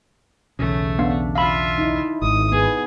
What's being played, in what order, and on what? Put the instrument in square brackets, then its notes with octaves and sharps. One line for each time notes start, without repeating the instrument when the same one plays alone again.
[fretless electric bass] B1 E2 C#3 [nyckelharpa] A3
[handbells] B3 F5 [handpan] D4
[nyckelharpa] F4 E5 [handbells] F5 B5
[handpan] D#4 E4
[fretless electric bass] G#1 [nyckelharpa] D#6
[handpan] B3 [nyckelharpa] G#4